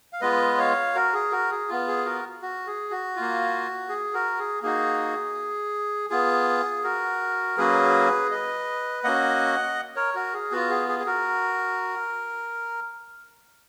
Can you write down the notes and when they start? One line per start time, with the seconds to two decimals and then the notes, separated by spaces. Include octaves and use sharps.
0.13 F5
0.21 G#3 B3 F4 B4 D#5
0.58 C#5 F5
0.95 F#4 A#4
1.13 G#4
1.31 F#4 A#4
1.51 G#4
1.69 B3 F4
1.88 G#4
2.05 F#4 A#4
2.42 F#4
2.67 G#4
2.91 F#4
3.16 A#3 F4
3.89 G#4
4.14 F#4 A#4
4.39 G#4
4.63 A#3 D#4 F#4 G#4
6.10 B3 F4 G#4
6.83 F#4 A#4
7.57 F#3 A#3 C#4 F#4 G#4 B4
8.31 B4 D#5
9.04 A#3 C#4 F#4 D#5 F#5
9.96 A#4 C#5
10.14 F#4 A#4
10.34 G#4
10.52 B3 F4 F#4
10.70 G#4
10.88 G#4
11.00 G#4
11.06 F#4 A#4